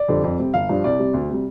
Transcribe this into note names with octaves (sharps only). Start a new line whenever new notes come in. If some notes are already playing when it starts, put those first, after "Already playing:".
Already playing: D5
F2 D3 G3 C4
F2
C3 G3 C4
G1 F5
G2 F3 D4
C2 D5
C3 G3
D2
C3 G3